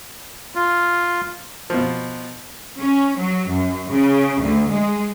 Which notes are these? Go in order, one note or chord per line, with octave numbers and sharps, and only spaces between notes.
F4
B2 F3
C#4
F#3
F#2
C#3
D2
G#3